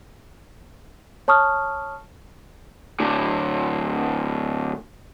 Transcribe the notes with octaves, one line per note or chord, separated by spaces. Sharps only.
C#5 A5 C#6 D#6 F6
A2 D3